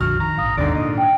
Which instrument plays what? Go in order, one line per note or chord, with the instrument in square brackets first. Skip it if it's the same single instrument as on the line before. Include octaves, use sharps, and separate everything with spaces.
[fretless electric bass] A#1 F2 D3 [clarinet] F#4 [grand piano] F6
[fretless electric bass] D#3 [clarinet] A#5
[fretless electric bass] A#1 G#2 [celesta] F5 D#6
[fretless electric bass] G#1 D#2 B2 [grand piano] G#2 D3 [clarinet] D5 [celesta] D7
[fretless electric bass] A#2 [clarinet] D#5
[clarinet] D4 [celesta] G5